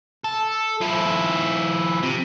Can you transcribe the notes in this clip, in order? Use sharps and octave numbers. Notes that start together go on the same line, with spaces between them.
A4
F3 E4
C3